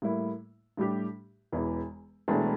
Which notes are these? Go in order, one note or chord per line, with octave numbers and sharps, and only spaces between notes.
A2 G3 A#3 E4
A2 G3 D4 G4
E1 E2 E3
E1 E2 E3 A3 D4